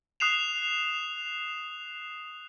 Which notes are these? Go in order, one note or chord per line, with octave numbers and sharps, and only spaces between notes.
D#6 F#6 C7 E7 F7